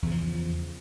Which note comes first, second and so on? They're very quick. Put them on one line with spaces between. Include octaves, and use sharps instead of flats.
E2 C#3 F3